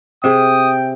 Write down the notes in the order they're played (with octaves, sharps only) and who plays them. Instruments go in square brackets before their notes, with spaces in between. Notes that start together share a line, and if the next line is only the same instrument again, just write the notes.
[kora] C3 [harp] G#4 E5 [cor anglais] G5 [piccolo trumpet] D#6